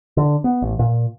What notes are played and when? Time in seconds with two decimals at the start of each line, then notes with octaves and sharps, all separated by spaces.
0.17 D3
0.44 B3
0.62 A1
0.79 A#2